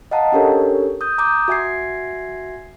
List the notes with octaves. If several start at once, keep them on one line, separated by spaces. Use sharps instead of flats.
D#5 F5 F#5 A5 A#5
C#4 D4 G4 A4 A#4 C#5
D#6 G6
A#5 D6 D#6 G6
F#4 E5 G#5 G#6 C7